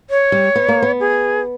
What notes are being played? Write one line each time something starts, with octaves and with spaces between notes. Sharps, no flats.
C#5
G3
B3
A#3
B3
G#4